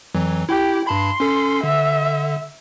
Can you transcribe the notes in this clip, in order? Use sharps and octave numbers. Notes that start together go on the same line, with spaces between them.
F2 E3 F#3
E4 G4
G2 A5 B5 C6
C#4 A4
D3 E5